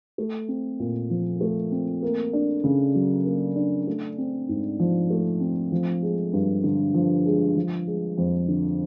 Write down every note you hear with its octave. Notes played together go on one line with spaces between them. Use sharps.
A3
C4
A#2
F3
A3
C4
A#3
D4
C#3
F#3
A#3
D4
A3
C4
G#2
F3
A3
C4
F3
G#3
G2
D3
F3
G#3
F3
G#3
F2
D3